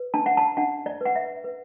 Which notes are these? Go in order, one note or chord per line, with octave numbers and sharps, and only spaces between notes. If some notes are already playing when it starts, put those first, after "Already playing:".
Already playing: B4
D4 A5
F#5
A5
D4 F#5
D5
B4 F#5
E5
B4